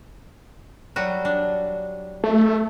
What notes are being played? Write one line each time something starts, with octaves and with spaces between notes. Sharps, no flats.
F#3 G3 F#4
D4
A3